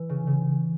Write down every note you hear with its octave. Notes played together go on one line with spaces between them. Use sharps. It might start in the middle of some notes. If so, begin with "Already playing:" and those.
Already playing: E3
C#3
C#3